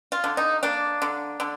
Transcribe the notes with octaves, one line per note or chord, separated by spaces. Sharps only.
F4
D3
D#4
A#3 D4
D3
D3